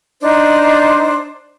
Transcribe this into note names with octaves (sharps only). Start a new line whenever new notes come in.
D4 D#4 C5